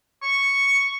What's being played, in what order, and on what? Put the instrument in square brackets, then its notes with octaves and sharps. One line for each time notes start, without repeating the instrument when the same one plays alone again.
[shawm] C#6